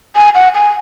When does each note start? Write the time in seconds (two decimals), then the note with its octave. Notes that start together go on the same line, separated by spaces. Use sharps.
0.16 G#5
0.35 F#5
0.54 G#5